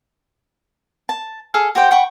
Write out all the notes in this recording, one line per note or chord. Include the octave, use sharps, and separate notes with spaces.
A5
G#4 A4 F5
F#4 G4 C5 G5
F#5 G5 B5 C#6